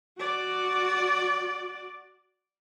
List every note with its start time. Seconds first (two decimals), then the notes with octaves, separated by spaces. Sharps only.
0.18 F#4 D5